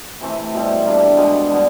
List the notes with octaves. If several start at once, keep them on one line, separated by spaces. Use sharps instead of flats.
C3 E3 A3 C4
B2 G3 C4
G3 A#3 D4 G4
B2 G#3 B3
D3 G3 B3